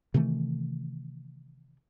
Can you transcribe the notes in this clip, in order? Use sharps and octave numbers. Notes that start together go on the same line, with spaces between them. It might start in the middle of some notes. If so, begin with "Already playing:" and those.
C3 D#3 E3 A3